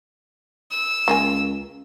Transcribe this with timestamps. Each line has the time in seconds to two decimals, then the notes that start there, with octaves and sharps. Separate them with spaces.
0.71 E6
1.08 C#2 G#3 A#3 G#5